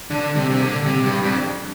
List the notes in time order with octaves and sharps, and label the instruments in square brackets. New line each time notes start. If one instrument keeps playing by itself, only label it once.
[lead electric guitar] D3 [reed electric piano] D4
[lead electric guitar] C3 [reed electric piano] G3
[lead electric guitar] C3
[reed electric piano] A#2 [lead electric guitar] D3
[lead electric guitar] C3 [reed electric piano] G3
[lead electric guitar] G2
[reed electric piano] G3
[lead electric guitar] F2
[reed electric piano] D4